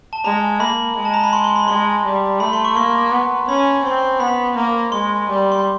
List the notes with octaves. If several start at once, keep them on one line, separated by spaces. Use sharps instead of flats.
A5
G#3 A#5
A#3 B5
G#3
A5
A#5
B5
C6
C6
B5
G#3 C6
G3
A3 B5
C6
C#6
A#3 C6
B3
C#4 B5
C4
B3 B5
A#3
G#3 C6
G3
C6